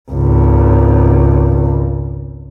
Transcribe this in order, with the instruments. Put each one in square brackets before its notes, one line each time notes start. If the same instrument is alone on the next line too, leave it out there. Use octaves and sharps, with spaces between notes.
[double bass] G#1 C#2